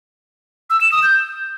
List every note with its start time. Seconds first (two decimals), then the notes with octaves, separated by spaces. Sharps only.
0.70 E6
0.81 E7
0.92 D#6
1.03 G6